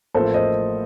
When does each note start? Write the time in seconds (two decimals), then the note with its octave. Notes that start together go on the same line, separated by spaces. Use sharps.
0.15 A1 A2 F3 A#3 A4 C5
0.34 C5 D#5